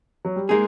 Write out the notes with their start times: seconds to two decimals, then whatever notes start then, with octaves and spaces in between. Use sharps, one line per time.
0.25 F#3
0.36 G3
0.49 G#3 A#3 D#4 G#4